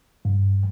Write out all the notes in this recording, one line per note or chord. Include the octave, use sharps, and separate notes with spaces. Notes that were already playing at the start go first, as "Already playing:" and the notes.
G2